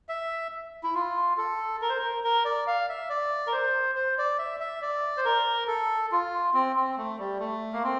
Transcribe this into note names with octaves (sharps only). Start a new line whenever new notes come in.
E5
E4
F4
A4
A#4
C5
A#4
A#4
D5
F5
E5
D5
A#4
C5
C5
D5
E5
E5
D5
C5
A#4
A4
F4
C4
C4
A3
G3
A3
A#3
C4